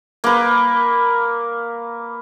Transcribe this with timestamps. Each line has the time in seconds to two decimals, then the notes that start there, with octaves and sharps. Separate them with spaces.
0.24 A#3 B4